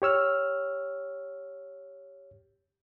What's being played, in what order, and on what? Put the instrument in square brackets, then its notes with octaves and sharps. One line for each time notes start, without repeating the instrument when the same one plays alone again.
[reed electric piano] G4 C#5 E6 F6